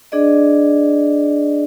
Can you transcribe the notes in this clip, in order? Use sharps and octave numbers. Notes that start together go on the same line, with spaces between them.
D4 G#4 D5 D#5